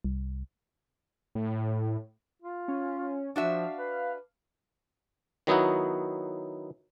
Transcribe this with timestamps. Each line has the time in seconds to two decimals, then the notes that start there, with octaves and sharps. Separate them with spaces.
0.05 C2
1.35 A2
2.42 F4
2.68 C#4
3.36 F3 D4 F#4 E5
3.63 F5
3.79 B4
5.47 D#3 F#3 B3 D#4 E4 F#4